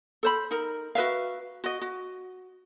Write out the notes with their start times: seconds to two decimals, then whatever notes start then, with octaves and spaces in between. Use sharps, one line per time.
0.23 A4 C5 B5
0.51 D#4 A#4
0.95 F#4 B4 E5 F5
1.64 F#4 D#5
1.81 F#4